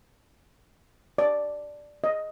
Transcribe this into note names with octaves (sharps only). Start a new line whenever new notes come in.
D5
D#5